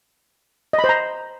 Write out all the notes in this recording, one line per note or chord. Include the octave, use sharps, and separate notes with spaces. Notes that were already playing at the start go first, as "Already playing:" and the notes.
D#5
B5
C5
A#5